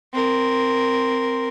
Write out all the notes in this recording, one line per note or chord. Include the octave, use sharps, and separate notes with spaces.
C4 A#4